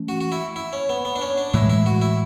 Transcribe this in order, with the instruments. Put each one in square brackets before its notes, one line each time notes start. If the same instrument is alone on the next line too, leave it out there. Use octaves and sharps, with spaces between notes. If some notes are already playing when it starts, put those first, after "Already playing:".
Already playing: [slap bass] E3 A3 C#4
[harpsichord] F#4
F#4
E4
E4
C#4
B3
B3
D4
C#4
D4
[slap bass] A2 E3 G#3 [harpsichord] E4
[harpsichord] E4
F#4
E4